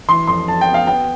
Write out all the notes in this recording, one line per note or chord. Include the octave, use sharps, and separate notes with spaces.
E3 C6
F2 C6
F2 A5
G5
B3
F5
B3 G5